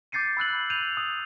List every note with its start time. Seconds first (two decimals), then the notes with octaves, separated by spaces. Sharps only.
0.12 D6 G6 A6 C7 C#7 D#7
0.37 B5 E6 F#6 F#7
0.70 G6 D#7 F7
0.97 D#6